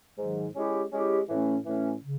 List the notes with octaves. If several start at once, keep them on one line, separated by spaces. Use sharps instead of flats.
G#2 D#3 F#3
G#3 C#4 E4 G4
G#3 C#4 E4 G4
A2 E3 A3 C#4
A2 E3 A3 C#4
C#3